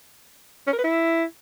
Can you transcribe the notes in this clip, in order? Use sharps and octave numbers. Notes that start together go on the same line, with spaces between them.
C#4
A#4
B4
E4